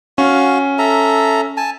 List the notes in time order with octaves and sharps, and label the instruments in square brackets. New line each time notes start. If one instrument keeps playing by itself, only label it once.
[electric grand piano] C#4 [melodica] F#4 F5 C#6
[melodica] A4 E5 A#5
G#5 A5